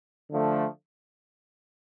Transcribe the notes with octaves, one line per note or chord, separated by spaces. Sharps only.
D3 F3 A3